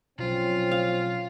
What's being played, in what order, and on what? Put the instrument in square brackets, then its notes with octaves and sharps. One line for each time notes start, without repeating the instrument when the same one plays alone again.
[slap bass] B2 F#3 [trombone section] F3 C4 C#4 [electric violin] F4
[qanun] F5